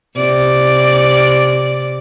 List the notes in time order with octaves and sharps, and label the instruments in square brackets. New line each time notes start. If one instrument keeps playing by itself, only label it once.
[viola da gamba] C3 D5